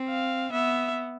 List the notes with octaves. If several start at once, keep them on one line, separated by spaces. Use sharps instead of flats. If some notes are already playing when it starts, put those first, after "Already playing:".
Already playing: C4
F5
B3 E5